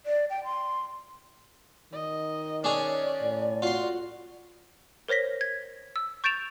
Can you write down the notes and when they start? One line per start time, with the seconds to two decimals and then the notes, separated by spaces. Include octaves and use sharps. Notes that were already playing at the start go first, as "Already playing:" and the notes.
0.06 D5
0.30 G5
0.45 C6
1.93 D#3 D#5
2.64 C#4 D4 G#4 C#5 D5
3.22 A2
3.62 F4 F#4 C6
5.08 A#4 C5 C#5 A#6 B6
5.41 G#6
5.96 E6
6.24 C#6 G6 A6 D7 E7 F7